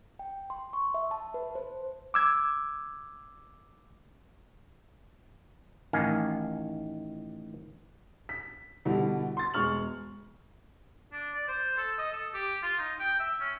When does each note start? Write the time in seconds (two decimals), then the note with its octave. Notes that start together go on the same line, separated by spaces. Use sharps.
0.19 G5
0.50 C6
0.73 C#6
0.94 E5
1.11 A5
1.34 B4
1.55 C5
2.14 D6 E6 G#6
5.93 A1 D#3 F5 G#5
8.29 B6
8.85 B2 D3 G3 E4
9.37 C6 A6
9.54 E1 G#3 C#6 F6 F#7
11.12 D4
11.34 D5
11.48 C5
11.77 A4
11.98 D#5
12.12 A4
12.34 G4
12.63 F4
12.79 D#4
12.99 G5
13.20 E5
13.40 C#4